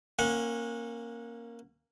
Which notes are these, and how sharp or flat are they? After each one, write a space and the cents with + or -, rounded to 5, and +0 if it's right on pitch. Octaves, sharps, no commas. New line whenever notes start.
A#3 +0 C#4 -25 F#5 -25